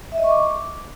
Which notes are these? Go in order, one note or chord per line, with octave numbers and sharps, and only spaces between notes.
E5
D#5
C#6
D6